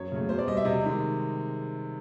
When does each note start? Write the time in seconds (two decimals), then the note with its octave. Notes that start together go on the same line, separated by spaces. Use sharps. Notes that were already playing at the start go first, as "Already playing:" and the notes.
Already playing: F#2 C#5
0.12 C#3 F#3 A3
0.29 B2 C5
0.39 D5
0.47 G3 D#5
0.57 E5
0.65 C3 D#5
0.84 D#3 G#3